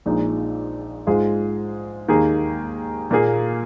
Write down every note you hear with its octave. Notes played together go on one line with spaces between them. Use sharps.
A#1 A#2 G#3 D#4
G#2 G#3 F4 G#4
D#2 D#3 A#3 G#4
A#2 A#3 G#4